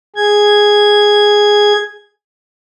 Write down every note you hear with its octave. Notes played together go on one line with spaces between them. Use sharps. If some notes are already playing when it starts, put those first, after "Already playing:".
G#4 G#6